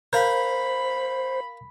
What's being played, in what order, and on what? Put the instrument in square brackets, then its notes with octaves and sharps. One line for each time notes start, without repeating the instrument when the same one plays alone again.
[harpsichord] A#4 F5 [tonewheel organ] C5 [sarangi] B5